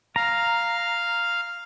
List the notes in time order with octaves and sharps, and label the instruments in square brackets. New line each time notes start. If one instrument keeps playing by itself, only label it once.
[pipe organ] F5 [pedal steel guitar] A#5